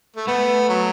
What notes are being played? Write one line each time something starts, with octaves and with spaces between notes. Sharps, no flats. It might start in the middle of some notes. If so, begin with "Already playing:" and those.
A3
A3 B3
F#3